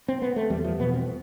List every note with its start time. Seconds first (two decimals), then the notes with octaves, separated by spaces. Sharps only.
0.08 C4
0.22 B3
0.36 A3
0.50 E2 G3
0.64 F3
0.79 B2 B3
0.94 C4